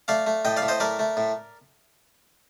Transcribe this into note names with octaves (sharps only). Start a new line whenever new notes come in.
A3 D5 F5
A3
A2 D#5 G5
D5 F5
A2
C5 D#5
A3 A#4 D5
A3
A2